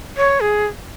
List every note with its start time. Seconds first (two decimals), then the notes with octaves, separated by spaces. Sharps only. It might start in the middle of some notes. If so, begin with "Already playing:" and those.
0.17 C#5
0.40 G#4